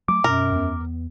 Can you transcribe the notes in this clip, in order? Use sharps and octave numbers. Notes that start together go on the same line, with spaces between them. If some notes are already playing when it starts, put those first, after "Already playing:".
F#3 A3 D6
F#2 B2 A#4
E2 B3